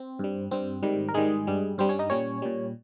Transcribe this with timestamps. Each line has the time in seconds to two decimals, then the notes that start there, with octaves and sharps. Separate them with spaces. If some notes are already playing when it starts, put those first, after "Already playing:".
Already playing: C4
0.19 G2 G3
0.51 G2 G3 C4
0.83 G#2 D#3 G3
1.09 A#4
1.14 G#2 D#3 G3 G#3 G#4
1.47 G2 G3
1.78 G2 G3 C4 C5
1.89 C#4 C#5
1.99 D#4 D#5
2.10 A#2 G3 C#4 C#5
2.42 A#2 G3